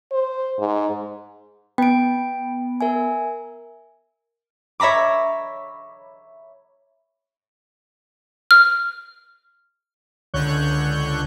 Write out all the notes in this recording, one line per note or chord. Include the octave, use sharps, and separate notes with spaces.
C5
G#2
B3 G5 D7
A#4 E5 G#5
C#5 E5 A#5 B5 D6
F6
C#2 D3 C#5 C#6 F#6 G6